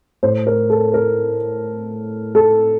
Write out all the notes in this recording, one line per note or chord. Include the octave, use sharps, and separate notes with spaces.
A2 C5
A#4
A4
A#4
A4